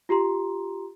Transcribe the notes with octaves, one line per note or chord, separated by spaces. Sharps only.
F4 G4 A#5 C6